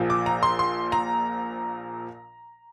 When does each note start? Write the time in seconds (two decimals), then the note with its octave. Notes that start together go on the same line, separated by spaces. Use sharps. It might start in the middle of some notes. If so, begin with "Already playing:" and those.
Already playing: A#1 A#2 F3
0.10 D6
0.26 A#5
0.43 C6
0.59 C6
0.92 A#5